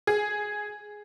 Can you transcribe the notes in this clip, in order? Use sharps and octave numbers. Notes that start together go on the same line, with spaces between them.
G#4